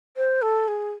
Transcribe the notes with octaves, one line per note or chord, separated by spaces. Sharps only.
C5
A4
G#4